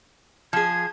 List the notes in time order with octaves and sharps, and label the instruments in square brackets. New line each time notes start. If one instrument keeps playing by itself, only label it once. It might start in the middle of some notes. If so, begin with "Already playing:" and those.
[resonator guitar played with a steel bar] F3 G#4 [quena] G#6